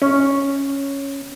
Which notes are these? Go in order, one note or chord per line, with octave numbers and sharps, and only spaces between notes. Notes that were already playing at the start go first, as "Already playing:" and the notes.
C#4